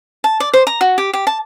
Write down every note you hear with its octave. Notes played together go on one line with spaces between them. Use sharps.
A5
D5
C5
A#5
F#4
G4
G4
A5